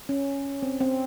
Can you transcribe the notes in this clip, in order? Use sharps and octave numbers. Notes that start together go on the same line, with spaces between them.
C#4
C4
C4